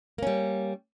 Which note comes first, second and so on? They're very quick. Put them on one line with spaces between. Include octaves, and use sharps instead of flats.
A#3 C#4 G3